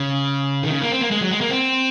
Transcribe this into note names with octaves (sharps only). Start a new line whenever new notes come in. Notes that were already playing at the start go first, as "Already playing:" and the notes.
Already playing: C#3
D#3
C#3
A#3
C4
A#3
G#3
F#3
G#3
A#3
C4